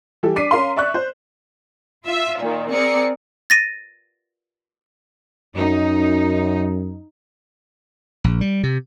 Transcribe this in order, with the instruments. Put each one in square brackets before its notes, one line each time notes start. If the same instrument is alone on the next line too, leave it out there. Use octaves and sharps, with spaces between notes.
[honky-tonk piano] E3 G3 G4 A4
D4 D6 B6 C7 D#7
C#4 A#4 F5 C6
D5 E5 C#6 F#6
C5
[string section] F4 E5
A#2 D#3
C4 G#4 A#4 D5 C#7
[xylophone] A6 A#6 D#7
[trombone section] F#2 [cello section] D#4
[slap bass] A#1
G3
C3